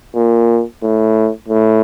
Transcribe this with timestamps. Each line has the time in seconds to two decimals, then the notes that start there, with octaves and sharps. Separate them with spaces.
0.15 A#2
0.83 A2
1.48 A2